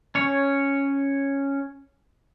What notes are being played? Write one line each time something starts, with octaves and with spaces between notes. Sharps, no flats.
C#4 C#5